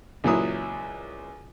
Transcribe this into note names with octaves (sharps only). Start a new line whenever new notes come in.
C#2 A#2 F#3 E4 D#6